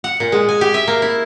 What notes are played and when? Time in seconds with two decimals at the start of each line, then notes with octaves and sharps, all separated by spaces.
0.04 F#5
0.20 A#2
0.32 G#3
0.49 G#5
0.61 G4
0.74 E5
0.87 A#3
1.02 E4